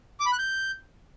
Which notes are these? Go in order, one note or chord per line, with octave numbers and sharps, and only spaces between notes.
D6
B5
F#6
G6